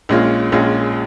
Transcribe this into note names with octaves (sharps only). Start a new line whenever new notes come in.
A#1 A#2 G#3 C#4 F4
A#1 A#2 G#3 C#4 F4